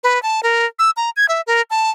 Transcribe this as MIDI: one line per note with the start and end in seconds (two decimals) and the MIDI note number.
0.03 0.21 71
0.22 0.40 81
0.43 0.65 70
0.79 0.90 88
0.97 1.10 82
1.17 1.26 92
1.29 1.41 76
1.47 1.62 70
1.70 1.90 81